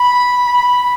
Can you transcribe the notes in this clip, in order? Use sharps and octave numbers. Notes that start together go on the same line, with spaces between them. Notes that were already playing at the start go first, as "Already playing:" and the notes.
Already playing: B5
B5